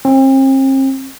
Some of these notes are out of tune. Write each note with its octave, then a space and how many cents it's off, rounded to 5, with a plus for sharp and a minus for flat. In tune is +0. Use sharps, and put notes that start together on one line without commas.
C4 +40